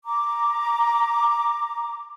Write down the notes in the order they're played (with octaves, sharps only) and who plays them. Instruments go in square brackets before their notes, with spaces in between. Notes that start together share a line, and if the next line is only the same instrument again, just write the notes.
[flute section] A#5 D6